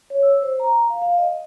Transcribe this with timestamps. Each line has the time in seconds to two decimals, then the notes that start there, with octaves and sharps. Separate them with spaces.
0.10 C#5
0.23 E6
0.42 C5
0.60 A#5
0.90 F5
1.02 F5
1.18 D#5